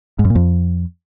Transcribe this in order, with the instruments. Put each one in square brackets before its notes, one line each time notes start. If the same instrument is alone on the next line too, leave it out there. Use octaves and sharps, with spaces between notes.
[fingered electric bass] G#2
F#2
A#2
F2